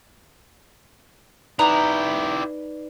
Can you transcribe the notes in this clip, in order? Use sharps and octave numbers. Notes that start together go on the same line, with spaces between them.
D#4 E4 G4 B4 D5 A#5 D#6 F#6